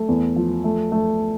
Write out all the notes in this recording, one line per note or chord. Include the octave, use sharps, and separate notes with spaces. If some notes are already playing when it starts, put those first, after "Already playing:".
Already playing: A3
E2
F3
A3
A3